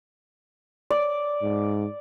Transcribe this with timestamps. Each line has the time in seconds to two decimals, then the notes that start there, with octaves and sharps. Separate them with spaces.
0.90 D5
1.42 G#2